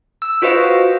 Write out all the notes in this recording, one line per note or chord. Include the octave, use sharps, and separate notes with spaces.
E6
F4 F#4 B4 C5 D#5 F5